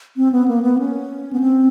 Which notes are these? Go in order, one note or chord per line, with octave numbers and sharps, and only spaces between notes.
C4
B3
A#3
B3
C#4
B3
C4